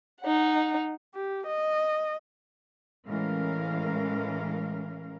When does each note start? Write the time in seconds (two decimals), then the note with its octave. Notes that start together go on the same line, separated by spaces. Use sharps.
0.22 D#4 F#5
1.15 G4
1.48 D#5
3.06 A2 E3 G#3 C#4 A#4 F5